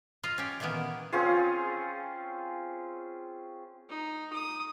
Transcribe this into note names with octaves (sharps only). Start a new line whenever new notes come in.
F4 D#5 F5
C#4 G4
A#2 D#3 E3 A#3 B3
C4 C#4 F4 G#4
D#4
D#6